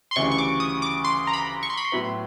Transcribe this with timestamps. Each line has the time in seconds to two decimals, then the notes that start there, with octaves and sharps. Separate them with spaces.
0.11 C6
0.16 D2 C#3 E3 G3 C#6
0.32 C#6
0.38 D6
0.60 D#6
0.82 D6
1.05 C6
1.27 A#5
1.33 B5
1.63 C#6
1.70 C6
1.77 B5
1.85 C6
1.92 A2 F#3 B3 E4